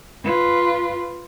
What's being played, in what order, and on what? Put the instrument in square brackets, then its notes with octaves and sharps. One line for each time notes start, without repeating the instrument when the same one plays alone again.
[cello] F4 B4